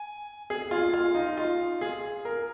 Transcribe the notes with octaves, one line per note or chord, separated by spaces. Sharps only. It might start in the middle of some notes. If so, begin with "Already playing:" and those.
Already playing: G#5
G#4
F4
F4
D#4
F4
G#4
A#4